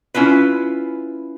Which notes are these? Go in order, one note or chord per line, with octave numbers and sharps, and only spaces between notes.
C#4 E4 F4 B4